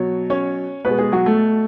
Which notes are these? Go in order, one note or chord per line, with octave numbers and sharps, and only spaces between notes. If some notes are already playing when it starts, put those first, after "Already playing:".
Already playing: B2 F#3 C#5
C#4 C#5
B2 G#3 B3 B4
G#3 G#4
F#3 F#4
A3 A4